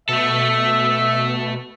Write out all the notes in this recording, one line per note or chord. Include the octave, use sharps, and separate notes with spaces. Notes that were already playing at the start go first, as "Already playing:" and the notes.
B2 A3 A4 E5